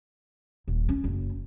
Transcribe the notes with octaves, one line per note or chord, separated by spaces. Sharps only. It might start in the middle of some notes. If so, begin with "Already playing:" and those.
D#1
C#4
F#1